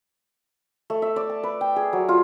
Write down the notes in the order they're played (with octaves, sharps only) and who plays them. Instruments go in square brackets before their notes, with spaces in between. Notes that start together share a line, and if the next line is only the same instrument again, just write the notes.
[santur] A3
E5
D5
A5
B4
G5
G#4
F#3
F4